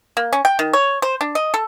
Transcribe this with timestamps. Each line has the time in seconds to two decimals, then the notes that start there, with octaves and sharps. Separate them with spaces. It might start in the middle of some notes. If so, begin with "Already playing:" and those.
0.17 A#3
0.33 C#4
0.45 G5
0.59 D#3
0.73 C#5
1.02 C5
1.21 D4
1.35 D#5
1.54 A4